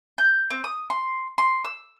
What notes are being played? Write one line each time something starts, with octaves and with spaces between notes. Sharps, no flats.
G6
C4
D#6
C6
C6
E6